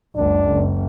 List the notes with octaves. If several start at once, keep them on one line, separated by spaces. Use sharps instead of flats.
F#1 C#2 D4
F#1